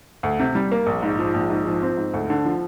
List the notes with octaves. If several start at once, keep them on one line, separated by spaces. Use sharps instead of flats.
D2
C3
G3
A#3
A#1
G#2
F3
A#1
G#2
F3
C4
G#2
D2
D3
F3